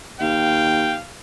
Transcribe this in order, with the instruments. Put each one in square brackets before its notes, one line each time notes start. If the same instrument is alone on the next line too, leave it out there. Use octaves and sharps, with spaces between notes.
[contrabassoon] D#2 [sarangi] F5 [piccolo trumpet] G5